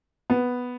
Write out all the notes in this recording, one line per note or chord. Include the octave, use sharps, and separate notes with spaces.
B3